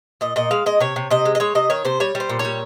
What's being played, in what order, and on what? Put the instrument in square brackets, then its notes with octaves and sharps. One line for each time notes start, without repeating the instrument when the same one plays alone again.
[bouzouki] A#2 D#5
A#2 D#5
G#3 F5
G#3 D#5
C3 C#5
C3
C3 D#5
G#3
D#5
G#3 C#5
C3 D#5
D#3 C#5
C3 C5
G3 C#5
G3
C5
A#2
C#5
G3